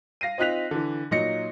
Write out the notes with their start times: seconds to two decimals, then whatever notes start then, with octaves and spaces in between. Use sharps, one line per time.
0.21 F5 A#6 C7 D#7
0.38 C4 D#4 F4 F#6 B6 F7
0.71 D3 E3
1.11 A#2 F#3 D#4 A#6 C#7